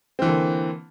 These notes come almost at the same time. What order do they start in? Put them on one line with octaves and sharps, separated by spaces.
C4 E3 D3 A#3